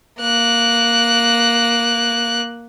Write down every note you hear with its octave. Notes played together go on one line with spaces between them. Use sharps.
A#3 F#6